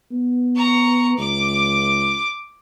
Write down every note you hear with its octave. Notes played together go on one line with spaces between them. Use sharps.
B3
A#5 C#6
C#2 D6